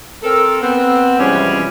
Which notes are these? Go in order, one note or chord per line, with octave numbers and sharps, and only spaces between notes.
C4 A4 A#4
B3 C4
C3 E3 F3 G3 G#3 C#4